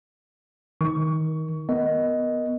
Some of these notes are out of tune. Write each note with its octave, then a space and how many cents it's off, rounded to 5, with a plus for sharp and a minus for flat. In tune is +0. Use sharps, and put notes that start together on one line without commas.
D#3 +20 C#6 +20
B3 +5 A#4 +0 D#5 +0